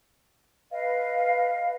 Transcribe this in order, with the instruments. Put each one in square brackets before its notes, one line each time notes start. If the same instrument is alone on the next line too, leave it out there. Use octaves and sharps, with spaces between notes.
[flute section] B4 D#5 F5